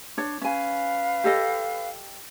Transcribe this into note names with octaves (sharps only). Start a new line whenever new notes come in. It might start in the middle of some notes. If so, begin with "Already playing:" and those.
D4 C#5
C#4 B4 F5 G#5
G4 A4 D#5